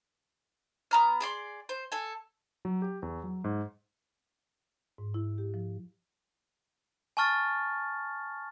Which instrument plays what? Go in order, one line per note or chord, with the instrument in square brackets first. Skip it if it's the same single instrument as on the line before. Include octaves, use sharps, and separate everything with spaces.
[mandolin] B3 A#5 F6
G#4 D5 C6
C5
A4 G#5
[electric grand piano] F#3
G4
E2
F#3
G#2
[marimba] G#2
E4
G4
F3
[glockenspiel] G#5 A5 C#6 F6 A6